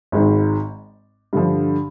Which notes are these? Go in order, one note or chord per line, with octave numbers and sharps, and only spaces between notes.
G#1 G#2 D#3
G2 D3 F3